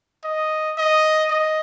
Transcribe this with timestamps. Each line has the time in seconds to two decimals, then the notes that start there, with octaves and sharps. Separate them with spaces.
0.24 D#5
0.78 D#5
1.31 D#5